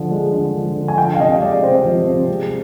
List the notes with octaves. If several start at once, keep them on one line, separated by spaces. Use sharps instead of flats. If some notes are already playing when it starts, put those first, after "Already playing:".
Already playing: D3 F3
G#3
D3
F3
D3
G#5
F3 G5
F5
C3 D#5
G#3 D5
C3 C5
F3
C3
G#3